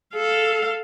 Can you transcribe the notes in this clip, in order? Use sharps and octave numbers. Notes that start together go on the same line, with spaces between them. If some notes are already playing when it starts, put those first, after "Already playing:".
A4 F5